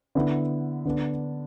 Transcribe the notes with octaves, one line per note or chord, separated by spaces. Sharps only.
D3 B3 E4
D3 B3 D4